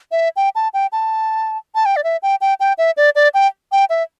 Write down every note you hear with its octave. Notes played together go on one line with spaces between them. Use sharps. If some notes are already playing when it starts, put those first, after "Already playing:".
E5
G5
A5
G5
A5
A5
G5
D5
E5
G5
G5
G5
E5
D5
D5
G5
G5
E5